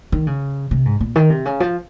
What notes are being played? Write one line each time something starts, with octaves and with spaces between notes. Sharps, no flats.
D#3
C#3
C3
G#2
A#2
D#3
C3
C#3
F3